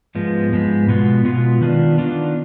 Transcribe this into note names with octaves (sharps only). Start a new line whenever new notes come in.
G#2 F3 G#3 B3
G#2 F3 G#3 B3
B2 G#3 B3 F4
B2 G#3 B3 F4
D#3 B3 D4 F4
D#3 B3 D4 F4